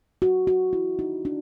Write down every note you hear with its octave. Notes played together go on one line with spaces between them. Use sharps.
F#4
F#4
E4
D#4
D4